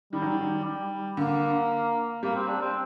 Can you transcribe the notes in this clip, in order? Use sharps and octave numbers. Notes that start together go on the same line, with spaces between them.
D#3 G3
F#3
D#3
G3
D3 A#3
G3 A#3
C4
D4
C4